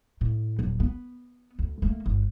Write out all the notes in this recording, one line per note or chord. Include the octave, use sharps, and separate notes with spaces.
A2
D#1 F#3
B3
D2
A3 A#3
G1